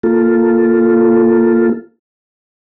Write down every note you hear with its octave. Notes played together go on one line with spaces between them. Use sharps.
A#3 F4 A4